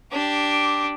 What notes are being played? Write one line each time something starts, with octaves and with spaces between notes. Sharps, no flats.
D4 G4